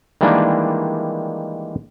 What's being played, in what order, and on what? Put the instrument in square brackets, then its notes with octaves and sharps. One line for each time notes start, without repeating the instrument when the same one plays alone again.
[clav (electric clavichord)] D#3 E3 G3 G#3 A#3 D4